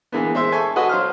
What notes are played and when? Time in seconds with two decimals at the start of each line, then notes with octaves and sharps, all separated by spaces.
0.12 D3 E3 G#3 A#3 B3
0.35 G#3 C5 E5
0.52 A4 G#5 C6 C#6
0.76 F#4 A4 B4 D#5 F#5
0.89 F#3 C5 F5 F6